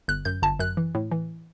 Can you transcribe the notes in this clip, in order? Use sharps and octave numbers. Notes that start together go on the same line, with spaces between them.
G1 F#6
F#2 G6
G1 A5
F#2 F#6
E3
A2
E3